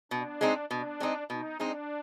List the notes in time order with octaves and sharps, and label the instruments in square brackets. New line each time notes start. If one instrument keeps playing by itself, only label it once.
[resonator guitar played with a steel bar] B2 [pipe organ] D4
[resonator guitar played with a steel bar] G#3 C4 D#4
[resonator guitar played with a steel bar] B2 [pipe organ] D4
[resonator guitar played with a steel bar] G#3 C4 D#4
[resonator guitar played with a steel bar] B2 [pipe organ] D#4
[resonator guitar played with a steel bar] G#3 C4 D#4 [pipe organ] D4